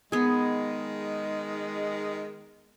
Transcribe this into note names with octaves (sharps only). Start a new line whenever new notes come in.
D#3 G#3 B3 G#4